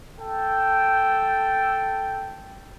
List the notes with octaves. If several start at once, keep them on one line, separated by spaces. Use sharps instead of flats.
A4 G5